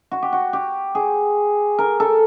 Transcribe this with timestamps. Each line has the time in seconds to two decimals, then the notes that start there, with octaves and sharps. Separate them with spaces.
0.11 F#4
0.22 G4
0.33 F#4
0.53 G4
0.95 G#4
1.79 A#4
2.00 A4